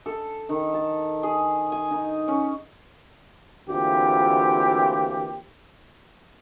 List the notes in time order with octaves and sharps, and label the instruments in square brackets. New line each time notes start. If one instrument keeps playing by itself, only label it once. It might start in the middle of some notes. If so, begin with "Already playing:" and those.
[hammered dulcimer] A4
D#3
A5
G#4
G#5
D#4
C#4
[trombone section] D2 A#2 E3 C4 F4 G4